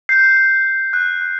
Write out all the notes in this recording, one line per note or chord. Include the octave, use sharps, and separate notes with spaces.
G6 C7
G6
G6
F#6
F#6